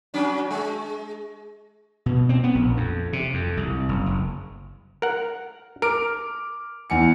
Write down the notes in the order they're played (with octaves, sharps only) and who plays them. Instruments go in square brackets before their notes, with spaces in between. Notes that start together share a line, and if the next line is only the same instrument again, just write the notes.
[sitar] F#3 C#4 D4
G#3
[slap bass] B2
C4
B3
A#1
F2
C3
F2
C2
F#1
F#1
[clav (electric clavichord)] A#4 F#5
[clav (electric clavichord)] A#4 [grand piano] D6 F6 D7
[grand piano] E2 G#5 C#7